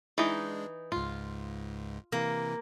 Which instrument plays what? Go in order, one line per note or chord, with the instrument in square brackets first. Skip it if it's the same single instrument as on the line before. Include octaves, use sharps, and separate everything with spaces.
[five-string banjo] E3 D#4 [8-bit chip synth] G#3 D4
[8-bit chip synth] C#2 G#2 [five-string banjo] F4
[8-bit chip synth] C3 E3 [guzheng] A#3